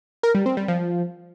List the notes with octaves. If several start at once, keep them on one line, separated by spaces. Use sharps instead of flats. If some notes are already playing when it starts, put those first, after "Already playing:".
A#4
G3
C4
G3
F3